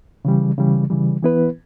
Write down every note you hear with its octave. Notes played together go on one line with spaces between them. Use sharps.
C#3 E3 G3
C#3 E3 G3
C#3 E3 G3
E3 B3 E4 B4